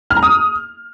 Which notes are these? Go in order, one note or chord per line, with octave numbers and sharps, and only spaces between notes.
F6
A#5
D#6